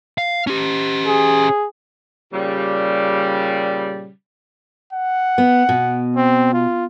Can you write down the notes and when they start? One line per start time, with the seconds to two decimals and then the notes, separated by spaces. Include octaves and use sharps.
0.18 F5
0.47 C#4 G4
1.07 G#4
2.33 A#2 C#3 G3
4.93 F#5
5.38 B3
5.69 B2
6.16 C4
6.53 F4